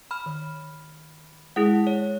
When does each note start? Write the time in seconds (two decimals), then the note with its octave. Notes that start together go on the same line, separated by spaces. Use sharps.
0.11 B5 F6
0.26 D#3
1.56 G#3 E4 G#4 F#5 D#6
1.87 C#5